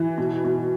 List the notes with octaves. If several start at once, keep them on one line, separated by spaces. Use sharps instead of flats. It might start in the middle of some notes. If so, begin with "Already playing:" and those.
Already playing: E3
B2
B2